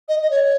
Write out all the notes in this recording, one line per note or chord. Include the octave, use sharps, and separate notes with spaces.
D#5
D#5
C#5